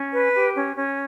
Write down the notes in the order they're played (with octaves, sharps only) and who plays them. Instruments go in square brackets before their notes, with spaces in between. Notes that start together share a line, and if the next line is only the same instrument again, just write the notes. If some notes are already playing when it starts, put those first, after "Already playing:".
Already playing: [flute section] C#4
B4
G4
C#4
C#4